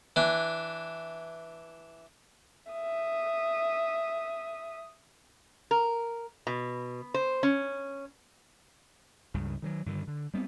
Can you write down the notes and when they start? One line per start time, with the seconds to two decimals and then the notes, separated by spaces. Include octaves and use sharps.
0.16 E3 D4
2.72 E5 D#6
5.71 A#4
6.47 B2
7.14 C5
7.43 C#4
9.34 C#2 G2 C#3
9.62 D#3 E3 F#3
9.86 G2 D3 D#3
10.07 D3
10.34 G3 B3 C4